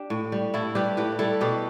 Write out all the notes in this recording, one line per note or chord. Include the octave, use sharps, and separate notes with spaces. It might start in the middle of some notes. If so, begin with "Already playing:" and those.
Already playing: D4 G4
A2
G3
A2 E4 A4
G3 G4 B4
A2 G4 B4
G3 E4 A4
B2 G4 B4